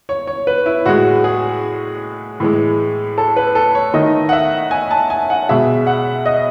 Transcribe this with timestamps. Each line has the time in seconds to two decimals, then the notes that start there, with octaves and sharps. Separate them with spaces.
0.09 C#5
0.27 C#5
0.47 B4
0.66 E4
0.86 A2 G#3 F#4
1.24 G#4
2.40 A2 E3 G#3
3.18 A4
3.36 B4
3.55 A4
3.75 C#5
3.94 D#3 A3 D#5
4.29 F#5
4.33 E5
4.71 G#5
4.91 A5
5.10 G#5
5.30 F#5
5.49 B2 G#3 E5
5.87 F#5
6.26 D#5